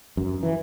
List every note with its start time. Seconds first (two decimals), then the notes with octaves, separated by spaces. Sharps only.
0.17 F#2
0.43 E3